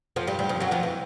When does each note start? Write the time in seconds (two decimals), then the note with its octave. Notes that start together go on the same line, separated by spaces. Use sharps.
0.16 F2 F3
0.27 G2 G3
0.39 G2 G3
0.49 F2 F3
0.60 F#2 F#3
0.71 F2 F3
0.83 E3